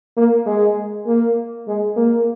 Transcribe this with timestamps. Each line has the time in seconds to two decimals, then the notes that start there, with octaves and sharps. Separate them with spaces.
0.16 A#3
0.46 G#3
1.06 A#3
1.67 G#3
1.96 A#3